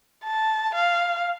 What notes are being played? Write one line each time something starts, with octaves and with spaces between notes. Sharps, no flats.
A5
F5